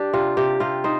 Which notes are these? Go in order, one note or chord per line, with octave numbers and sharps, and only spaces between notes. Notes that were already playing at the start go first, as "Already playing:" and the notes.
Already playing: D4 G4
C3 F4
C3 G4
C3 F4
D#4 C5